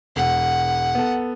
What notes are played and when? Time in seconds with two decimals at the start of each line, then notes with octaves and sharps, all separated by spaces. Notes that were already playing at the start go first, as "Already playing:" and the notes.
0.16 E1 F#5
0.95 B3 A4